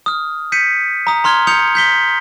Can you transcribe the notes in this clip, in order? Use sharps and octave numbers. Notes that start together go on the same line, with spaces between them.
D#6 F6
G6 B6 C#7 D#7
A#5 D#6
A#5 C6 F6 G#6 G7
D#6 G6 C#7 F7
G6 B6 G7